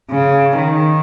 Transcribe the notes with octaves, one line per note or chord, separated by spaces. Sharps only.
C#3
D#3